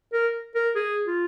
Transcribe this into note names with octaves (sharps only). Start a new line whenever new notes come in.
A#4
A#4
G#4
F4